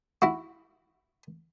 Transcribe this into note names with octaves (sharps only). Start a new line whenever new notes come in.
E4 F#4